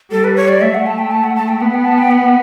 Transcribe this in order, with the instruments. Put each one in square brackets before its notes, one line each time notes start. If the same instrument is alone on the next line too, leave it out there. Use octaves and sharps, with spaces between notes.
[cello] G3 [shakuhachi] A4
[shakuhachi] B4
C#5
D5
[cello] A3 [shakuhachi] E5
[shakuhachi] F#5
A5
G5
A5
F#5
A5
G5
[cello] B3 [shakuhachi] F#5
[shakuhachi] G5
A5
G5
F#5